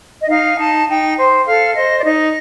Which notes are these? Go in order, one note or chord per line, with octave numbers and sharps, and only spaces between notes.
D#5
D#4 F5
D#4 A5
D#4 G5
C5
A4 F5
C5 D#5
D5
D#4 D#5